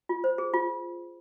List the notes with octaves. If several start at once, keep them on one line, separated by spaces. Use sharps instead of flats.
F4
C5
G#4
F4